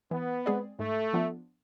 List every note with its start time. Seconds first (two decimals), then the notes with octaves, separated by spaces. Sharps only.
0.11 E3 B3
0.46 G#3 C4 G#4 D5
0.79 G#2 A3
1.13 F3 B3 D4 F4